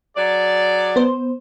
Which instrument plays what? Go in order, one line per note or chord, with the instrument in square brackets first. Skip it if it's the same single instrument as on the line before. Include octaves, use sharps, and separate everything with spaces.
[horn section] F#3 G#4 D5
[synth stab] B3 C5